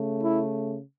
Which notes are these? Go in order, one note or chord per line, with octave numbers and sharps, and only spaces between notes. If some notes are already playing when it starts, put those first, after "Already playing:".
Already playing: C#3 A3
E4